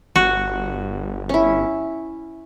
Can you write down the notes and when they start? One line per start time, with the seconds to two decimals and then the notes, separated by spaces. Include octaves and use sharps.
0.16 G1 F#4
1.29 C#4 E4